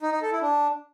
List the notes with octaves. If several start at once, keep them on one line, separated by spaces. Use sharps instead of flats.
D#4
D#4
A4
E4
D4